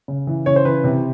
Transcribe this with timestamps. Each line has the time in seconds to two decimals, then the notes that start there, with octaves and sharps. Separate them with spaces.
0.08 C#3
0.27 E3
0.46 C#3 C#5
0.56 C5
0.65 E3 B4
0.84 C3